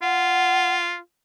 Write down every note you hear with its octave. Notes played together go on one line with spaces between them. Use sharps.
F4 F#5